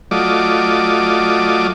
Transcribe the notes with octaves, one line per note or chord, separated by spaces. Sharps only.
F#3 A3 F4 D5 D#5 D6